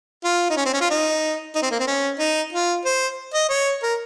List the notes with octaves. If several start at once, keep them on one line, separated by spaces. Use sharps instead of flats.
F4
D#4
C#4
C4
C#4
F4
D#4
D#4
C4
A#3
C4
C#4
D#4
F4
C5
D#5
C#5
A#4